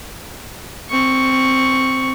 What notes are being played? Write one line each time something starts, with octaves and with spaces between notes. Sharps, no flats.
C4 C#6